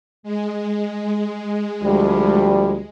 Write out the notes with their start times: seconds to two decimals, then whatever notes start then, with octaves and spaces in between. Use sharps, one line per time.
0.23 G#3
1.83 D2 F3 G3